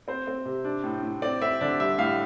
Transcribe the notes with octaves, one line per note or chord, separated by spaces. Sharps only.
C4 C5
C4
C3
D4
A2
A2
C4 D5
C4 E5
D3 D5
G3 E5
A2 F5